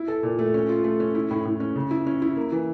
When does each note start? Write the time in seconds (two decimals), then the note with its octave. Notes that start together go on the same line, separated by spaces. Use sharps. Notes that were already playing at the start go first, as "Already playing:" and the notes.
Already playing: E4
0.08 A4
0.23 A#2
0.39 A3
0.54 C#4
0.69 F4
0.84 A3
1.00 C#4
1.15 E4
1.31 A2
1.45 A2
1.60 C#4
1.76 C#3
1.91 E4
2.06 C#4
2.22 E4
2.37 A#3
2.52 E3